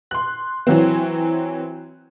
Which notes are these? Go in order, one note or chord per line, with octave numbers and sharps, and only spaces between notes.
C6 F#6
E3 F#3 C4